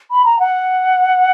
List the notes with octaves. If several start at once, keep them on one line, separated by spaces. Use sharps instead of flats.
B5
A#5
F#5